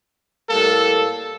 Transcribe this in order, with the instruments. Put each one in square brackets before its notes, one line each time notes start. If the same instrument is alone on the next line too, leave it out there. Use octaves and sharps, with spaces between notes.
[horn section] A2 G3 A#3 A4